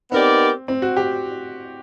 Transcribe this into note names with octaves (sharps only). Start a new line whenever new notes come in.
B3 C4 D#4 G4 A#4 D5
C4
F#4
G4